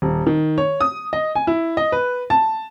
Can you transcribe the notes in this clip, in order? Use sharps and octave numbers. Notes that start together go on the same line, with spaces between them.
D#1
D#3
C#5
D#6
D#5
G#5
E4
D#5
B4
A5